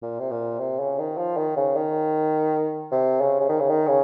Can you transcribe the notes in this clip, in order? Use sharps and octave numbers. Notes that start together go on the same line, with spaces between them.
A#2
C3
A#2
C3
C#3
D#3
F3
D#3
C#3
D#3
C3
C#3
C#3
D#3
C#3
D#3
C#3